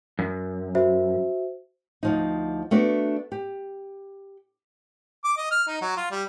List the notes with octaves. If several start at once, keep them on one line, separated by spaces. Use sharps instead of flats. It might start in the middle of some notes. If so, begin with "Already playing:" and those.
F#2
F#4 C5 E5
D2 F3 D#4
A3 B3 D4 F#4
G4
D6
D#5
F6
D#4
F#3
F4
G3